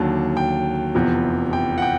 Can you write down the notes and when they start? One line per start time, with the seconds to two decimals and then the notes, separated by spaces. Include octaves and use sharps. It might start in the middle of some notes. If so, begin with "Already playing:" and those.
Already playing: D#2 D3 F#3 A5
0.37 G5
0.95 F1 E2 C3 F3
1.53 G5
1.78 F#5
1.82 G5